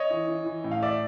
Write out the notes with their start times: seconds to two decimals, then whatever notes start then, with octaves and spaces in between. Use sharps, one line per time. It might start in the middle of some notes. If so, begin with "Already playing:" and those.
Already playing: C#5 D#5
0.10 E3
0.28 E3
0.46 E3
0.64 A2
0.71 F5
0.83 D5 E5